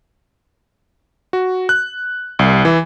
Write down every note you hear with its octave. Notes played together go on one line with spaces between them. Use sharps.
F#4
F#6
C2
E3